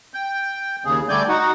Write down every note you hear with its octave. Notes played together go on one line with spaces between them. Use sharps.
G5
D#2 C#3 G#4
D3 G3 A3 D5 G#5 G6
D#4 F#4 F#5